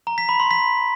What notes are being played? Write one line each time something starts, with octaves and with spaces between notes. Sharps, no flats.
A#5
B6
B5
C6
B6